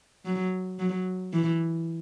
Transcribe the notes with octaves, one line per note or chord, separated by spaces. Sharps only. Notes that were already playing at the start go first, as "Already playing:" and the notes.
F#3
F#3
E3